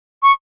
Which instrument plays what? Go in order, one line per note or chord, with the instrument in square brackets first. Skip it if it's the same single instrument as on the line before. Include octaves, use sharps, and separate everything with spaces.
[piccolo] C#6